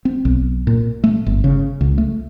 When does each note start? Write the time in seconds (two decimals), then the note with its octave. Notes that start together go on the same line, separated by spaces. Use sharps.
0.05 C4
0.25 B1
0.67 A#2
1.04 A3
1.26 G1
1.44 C#3
1.81 C#2
1.98 A3